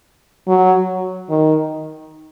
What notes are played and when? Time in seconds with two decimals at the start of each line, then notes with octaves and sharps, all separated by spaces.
0.48 F#3
1.29 D#3